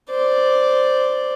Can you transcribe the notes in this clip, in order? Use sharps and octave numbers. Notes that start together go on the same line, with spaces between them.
C5 D5